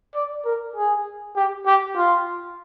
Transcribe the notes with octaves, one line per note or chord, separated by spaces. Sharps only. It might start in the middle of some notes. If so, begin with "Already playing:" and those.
D5
A#4
G#4
G4
G4
F4